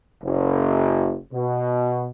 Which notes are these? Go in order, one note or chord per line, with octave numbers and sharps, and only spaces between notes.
F#1
B2